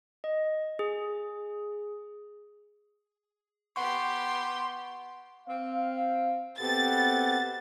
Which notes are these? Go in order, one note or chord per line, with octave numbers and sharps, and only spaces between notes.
D#5
G#4
B3 G4 F#5 C6 C#6
C4 F5
B2 B3 C4 G4 A4 A6